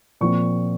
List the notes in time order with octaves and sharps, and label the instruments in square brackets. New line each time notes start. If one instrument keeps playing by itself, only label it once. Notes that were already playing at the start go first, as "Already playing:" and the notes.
[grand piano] A#2 F3 C4 C#6